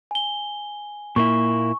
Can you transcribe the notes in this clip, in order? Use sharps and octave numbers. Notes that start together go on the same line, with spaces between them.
G#5 G7
A#2 A#3 E4 C#6